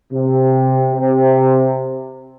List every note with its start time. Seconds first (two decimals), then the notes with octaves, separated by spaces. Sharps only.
0.12 C3
0.92 C3